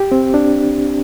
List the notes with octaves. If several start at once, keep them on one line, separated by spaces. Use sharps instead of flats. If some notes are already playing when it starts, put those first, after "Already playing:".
Already playing: G4
C4
D4